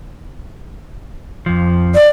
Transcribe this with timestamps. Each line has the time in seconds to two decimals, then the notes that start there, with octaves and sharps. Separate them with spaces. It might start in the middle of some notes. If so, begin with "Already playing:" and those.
1.46 F2 F3
1.95 D5